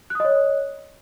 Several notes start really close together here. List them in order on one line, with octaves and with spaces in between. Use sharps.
F#6 D#6 D#5 C#5